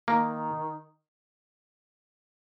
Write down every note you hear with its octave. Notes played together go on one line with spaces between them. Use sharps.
D#3 A#3